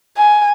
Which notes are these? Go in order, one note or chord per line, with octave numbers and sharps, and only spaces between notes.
G#5